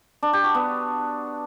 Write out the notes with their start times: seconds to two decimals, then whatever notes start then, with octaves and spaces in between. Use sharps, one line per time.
0.23 D4
0.33 G4
0.44 F#4
0.55 B3